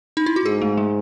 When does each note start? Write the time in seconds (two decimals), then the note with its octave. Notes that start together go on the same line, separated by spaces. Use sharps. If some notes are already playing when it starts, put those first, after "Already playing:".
0.17 D#4
0.26 E4
0.36 F#4
0.45 G#2 G#4
0.62 A3
0.77 G#3